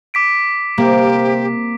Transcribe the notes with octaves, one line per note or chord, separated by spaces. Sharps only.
D6 B6 D7
C3 A#3 G4